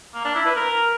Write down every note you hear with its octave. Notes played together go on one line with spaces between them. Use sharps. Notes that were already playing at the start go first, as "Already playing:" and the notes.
A#3
D4
E4
B4
A#4